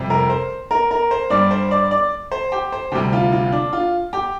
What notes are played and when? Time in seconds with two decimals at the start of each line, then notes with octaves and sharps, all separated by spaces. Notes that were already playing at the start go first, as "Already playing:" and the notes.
Already playing: F2 C3 G3
0.10 A#4
0.30 C5
0.71 A#4
0.91 A#4
1.11 C5
1.30 G2 G3 D5
1.51 C5
1.71 D5
1.91 D5
2.32 C5
2.52 G4
2.72 C5
2.92 D2 C3 G3 G4
3.13 F4
3.32 F4
3.52 D4
3.73 F4
4.13 G4